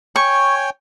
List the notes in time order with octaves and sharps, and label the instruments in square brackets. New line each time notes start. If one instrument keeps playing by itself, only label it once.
[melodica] C#5 G5 G#5 [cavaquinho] C#6